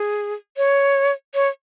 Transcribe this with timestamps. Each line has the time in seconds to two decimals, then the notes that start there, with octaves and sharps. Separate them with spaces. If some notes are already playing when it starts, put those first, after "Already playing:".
Already playing: G#4
0.57 C#5
1.34 C#5